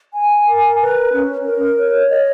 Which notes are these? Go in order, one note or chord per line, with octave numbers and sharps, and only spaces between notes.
G#5
A#4
B4
C#4
A#4
C#5
D#5